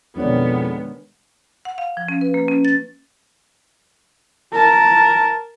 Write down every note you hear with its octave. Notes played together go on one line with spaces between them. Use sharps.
F2 B2 D#3 G#3 B3 D4 C#5 D5
F#5
F5
F3
C#4
B4
A#3
C#4
A6
A#4 A5